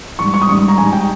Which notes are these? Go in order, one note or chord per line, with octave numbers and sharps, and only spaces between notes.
G#2 G3 C#6
C#6
D#6
G#2 G3 C#6
A#5
G#2 G3 G#5
G5